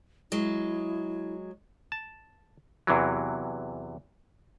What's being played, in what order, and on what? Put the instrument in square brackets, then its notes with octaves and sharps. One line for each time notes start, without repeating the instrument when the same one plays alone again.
[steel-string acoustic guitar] F#3 G#3 [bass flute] E4
[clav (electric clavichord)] A5
E2 C3 E3 F#3